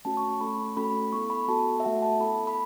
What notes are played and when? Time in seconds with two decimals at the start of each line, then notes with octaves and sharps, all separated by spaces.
0.05 A3 C#4 F#4 A5
0.17 C#6
0.29 C#6
0.41 A3 C#4 A4 B5
0.77 A3 C#4 F#4 A4 B5
1.12 B3 E4 A4 C#6
1.30 B5
1.48 B3 F#4 A4 A5
1.80 E5
1.84 A3 F#4 A4 F#5
2.02 A5
2.20 B3 E4 A4 B5
2.47 B5